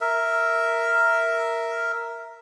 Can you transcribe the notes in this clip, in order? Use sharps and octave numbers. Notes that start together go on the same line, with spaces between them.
A#4 E5